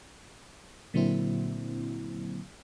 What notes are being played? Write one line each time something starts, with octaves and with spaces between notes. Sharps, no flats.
A#2 D3 F#3 A#3 C4 E4